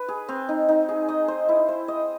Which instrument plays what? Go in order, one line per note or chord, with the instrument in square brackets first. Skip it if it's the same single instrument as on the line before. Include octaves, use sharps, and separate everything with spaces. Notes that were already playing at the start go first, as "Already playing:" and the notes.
Already playing: [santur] B4
G#4
C4
D#4
D#4
G#4
D#5
C5
E4
C5
D#5